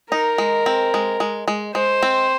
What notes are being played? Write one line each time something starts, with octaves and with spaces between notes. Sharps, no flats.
D#4 A#4
G#3
C4
G#3
G#3
G#3
G#3 C5
C4